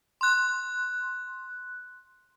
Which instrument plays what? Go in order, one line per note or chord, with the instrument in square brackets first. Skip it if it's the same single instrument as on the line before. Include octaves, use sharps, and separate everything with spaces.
[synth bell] C6 F#6